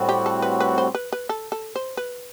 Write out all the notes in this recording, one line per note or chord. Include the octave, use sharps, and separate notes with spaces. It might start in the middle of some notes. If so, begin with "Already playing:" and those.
Already playing: A2 G3 C4 F#4
G4
A4
B4
B4
C5
B4
B4
A4
A4
C5
B4